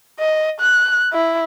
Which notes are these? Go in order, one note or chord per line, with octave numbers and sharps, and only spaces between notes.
D#5
F#6
E4